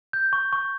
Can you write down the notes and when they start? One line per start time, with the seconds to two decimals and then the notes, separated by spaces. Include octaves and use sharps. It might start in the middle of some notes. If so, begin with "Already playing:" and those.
0.13 G6
0.33 C#6
0.53 C#6